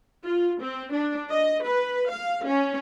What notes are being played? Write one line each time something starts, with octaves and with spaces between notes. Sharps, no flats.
F4
C4
D4
D#5
B4
F5
C#4